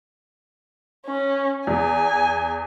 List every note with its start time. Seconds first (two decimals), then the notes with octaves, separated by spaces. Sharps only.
1.06 C#4
1.67 E2 G#5